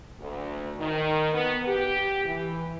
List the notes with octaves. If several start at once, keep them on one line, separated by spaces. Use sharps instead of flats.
D2
D#3
B3
G4
E3